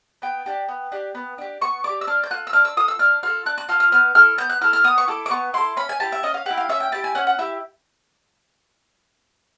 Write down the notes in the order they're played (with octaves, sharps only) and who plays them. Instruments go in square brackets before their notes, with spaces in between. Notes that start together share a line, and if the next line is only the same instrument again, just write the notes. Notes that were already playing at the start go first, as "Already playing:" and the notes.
[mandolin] B3 G5
D4 G4
B3
D4 G4
B3
D4 G4
B3 C#6
D4 G4 D6
E6
D4 F6
G6
F4 A4 F#6
E6
D4 F6
E6
F4 A4 D#6
E6
D4 F6
F4 A4 F6
D4 F#6
F#6
F4 A4 F6
F6
B3 F6
E4 A4 F6
B3 G6
F#6
E4 A4 F6
F6
B3 D#6
C#6
E4 A4 D6
D6
B3 C#6
E4 A4 C6
C#4 B5
G#5
E4 G4 A5
E5
C#4 D#5
F5
E4 G4 F#5
F5
C#4 E5
G5
E4 G4 A5
G#5
C#4 F#5
F#5
E4 G4 E5